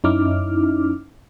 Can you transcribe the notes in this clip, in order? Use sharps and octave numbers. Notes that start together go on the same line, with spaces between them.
F#2 C#4 D#4 E4 D6 F6